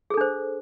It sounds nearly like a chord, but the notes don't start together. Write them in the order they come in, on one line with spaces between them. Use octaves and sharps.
G#4 A4 D4 C5